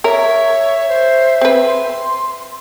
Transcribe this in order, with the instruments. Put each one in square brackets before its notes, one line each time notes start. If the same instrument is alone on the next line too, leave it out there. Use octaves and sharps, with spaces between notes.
[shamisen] A#4 [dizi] C#5 [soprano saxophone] E5
[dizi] C5
[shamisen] C4 B4
[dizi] C6